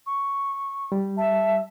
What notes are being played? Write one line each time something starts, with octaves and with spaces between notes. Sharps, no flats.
C#6
G3
E5 A5